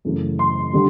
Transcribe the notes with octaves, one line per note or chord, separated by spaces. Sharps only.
F#2 C#3 E3 A3
C6
D3 G3